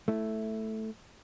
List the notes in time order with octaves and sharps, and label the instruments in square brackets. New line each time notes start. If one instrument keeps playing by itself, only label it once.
[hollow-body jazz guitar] A3 E4